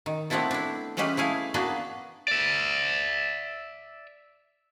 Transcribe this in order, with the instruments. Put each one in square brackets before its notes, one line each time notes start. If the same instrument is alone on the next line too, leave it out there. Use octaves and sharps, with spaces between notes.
[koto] D#3
A3 B3 C4 D4 E4 A4
D4 E4
E3 G3 G#3 C#4 G4 B4
A3 E4 G#4 F5
A#3 B3 D4 F#4 G#4
[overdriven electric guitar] D5 E5